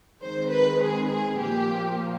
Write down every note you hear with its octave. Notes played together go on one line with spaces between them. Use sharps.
D#3 G#3 C4 C5
B4
G#4
G#4
A#2 F3 A#3 G4